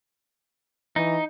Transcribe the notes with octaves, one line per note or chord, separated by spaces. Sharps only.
E3 D#4